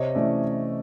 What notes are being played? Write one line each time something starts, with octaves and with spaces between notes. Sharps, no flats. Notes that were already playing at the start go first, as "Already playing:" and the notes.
Already playing: C3 C#5 D#5
E3 A3 C#4 D5 E5